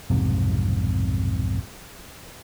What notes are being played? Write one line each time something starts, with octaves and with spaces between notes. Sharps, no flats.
B1 F2 G#2 C3